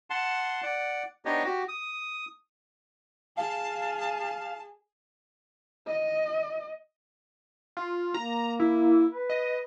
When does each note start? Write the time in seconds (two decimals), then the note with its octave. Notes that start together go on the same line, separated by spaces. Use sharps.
0.10 F#5 A5 C6
0.63 D5 F#5
1.25 B3 D4 D#4 G4 C#5 D#5
1.44 F#4 G4
1.68 D#6
3.37 G#4 F5 A5
5.87 D#5
7.77 F4
8.14 A#3 A#5
8.60 E4
9.10 B4
9.30 D#5